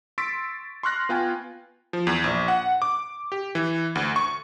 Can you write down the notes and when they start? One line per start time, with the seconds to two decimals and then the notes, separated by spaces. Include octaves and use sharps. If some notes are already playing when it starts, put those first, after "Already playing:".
0.18 C6 C#6 E6 A6 B6 D7
0.83 C6 C#6 F6 F#6 A#6
1.09 B3 F4 G5 G#5
1.93 F3
2.07 E2
2.24 A#1
2.48 F#5
2.82 D6
3.32 G4
3.55 E3
3.95 D2
4.16 C#6